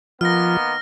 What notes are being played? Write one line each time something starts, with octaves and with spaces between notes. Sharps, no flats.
D#3 F3 A#3 B3 F6 A#6